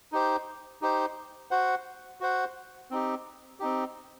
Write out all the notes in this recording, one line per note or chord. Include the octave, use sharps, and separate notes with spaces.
D#4 G4 C5
D#4 G4 C5
F#4 C5 F#5
F#4 C5 F#5
C4 D#4 G4
C4 D#4 G4